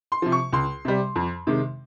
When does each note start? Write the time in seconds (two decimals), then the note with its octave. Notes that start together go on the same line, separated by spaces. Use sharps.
0.12 C6
0.22 C3 F3
0.32 C#6
0.52 C#2 C6
0.85 C3 G3
1.15 F2
1.47 C3 D#3 G#3